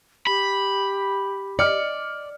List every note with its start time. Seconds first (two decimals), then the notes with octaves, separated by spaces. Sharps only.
0.27 G4 B5
1.59 D5 D#5 F6 C#7